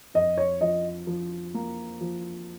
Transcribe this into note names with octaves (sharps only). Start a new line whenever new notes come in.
F2 D#5
C#5
F3 D#5
F3
A#3
F3